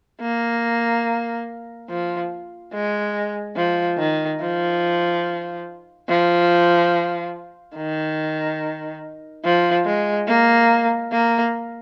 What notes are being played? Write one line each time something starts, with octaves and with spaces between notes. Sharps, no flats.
A#3
F3
G#3
F3
D#3
F3
F3
D#3
F3
G#3
A#3
A#3